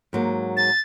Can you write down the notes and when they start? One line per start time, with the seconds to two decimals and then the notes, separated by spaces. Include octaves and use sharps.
0.13 G#2 F#3 A#3
0.57 A6